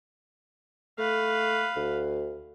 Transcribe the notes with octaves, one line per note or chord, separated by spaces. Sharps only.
A3 B4 F5
D2